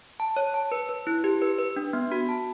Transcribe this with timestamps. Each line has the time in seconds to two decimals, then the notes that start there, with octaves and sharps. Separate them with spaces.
0.20 A5
0.37 C#5
0.54 A5
0.72 B4
0.89 B4
1.07 E4
1.24 G4
1.42 B4
1.59 B4
1.76 D4
1.93 B3
2.12 F#4
2.29 A5